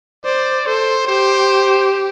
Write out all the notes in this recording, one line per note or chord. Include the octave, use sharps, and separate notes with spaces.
C5 D5
A4 C5
G4 C5